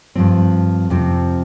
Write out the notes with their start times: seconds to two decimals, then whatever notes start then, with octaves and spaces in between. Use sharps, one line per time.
0.15 G2 F3 C4
0.90 F2 C3 F3 C4